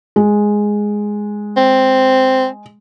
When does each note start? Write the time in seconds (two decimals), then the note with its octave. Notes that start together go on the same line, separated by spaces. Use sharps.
0.16 G#3
1.57 C4